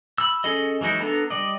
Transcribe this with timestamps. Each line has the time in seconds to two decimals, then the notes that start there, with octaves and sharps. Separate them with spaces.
0.18 B5 E6
0.44 C#4 G#4 A4 D#5
0.81 E3 F#3 G#3 D#4 E4
1.00 B3 D4 A4 A#5
1.30 G3 D5 D#5